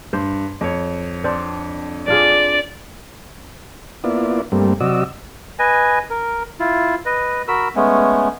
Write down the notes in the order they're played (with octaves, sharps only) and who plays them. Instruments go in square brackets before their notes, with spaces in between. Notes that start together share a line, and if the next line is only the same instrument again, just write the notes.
[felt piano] G2 [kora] C5
[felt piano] F2 C#5
[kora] C4 D4 C5
[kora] D4 F4 G#4 [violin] D5
[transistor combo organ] A#3 B3 E4 F4 D5
G2 G3 A3 A#3 C4
C3 F#3 F#4 D5 D#5 E6
[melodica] B4 D#5 G#5
A#4
E4 F4
B4 D#5
F#4 A#4 B5 E6
G#3 A3 B3 C#4